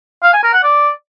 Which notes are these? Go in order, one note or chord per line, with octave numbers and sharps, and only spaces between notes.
F5
G#5
A#4
F#5
D5